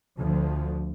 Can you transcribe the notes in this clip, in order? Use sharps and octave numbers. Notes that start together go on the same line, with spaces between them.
D2 F3